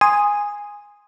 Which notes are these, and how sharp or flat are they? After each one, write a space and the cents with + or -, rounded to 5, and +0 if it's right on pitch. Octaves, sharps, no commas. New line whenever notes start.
G#5 -10 C6 +0 D#6 +0